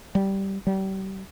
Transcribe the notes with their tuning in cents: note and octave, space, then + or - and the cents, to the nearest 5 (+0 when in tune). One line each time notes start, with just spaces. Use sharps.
G3 -10
G3 -35